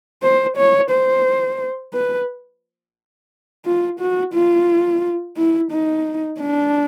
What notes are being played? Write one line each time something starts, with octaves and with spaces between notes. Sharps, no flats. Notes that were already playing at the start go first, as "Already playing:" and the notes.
C5
C#5
C5
B4
F4
F#4
F4
E4
D#4
D4